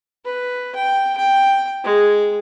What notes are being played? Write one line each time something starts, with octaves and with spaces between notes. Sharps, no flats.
B4
G5
G5
G#3